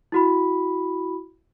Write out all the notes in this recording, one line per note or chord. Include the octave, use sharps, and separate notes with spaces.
E4 F#4 B5